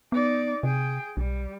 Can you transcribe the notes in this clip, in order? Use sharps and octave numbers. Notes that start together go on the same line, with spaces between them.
B3 D#4 D5
C3 G#4 G5
B1 G3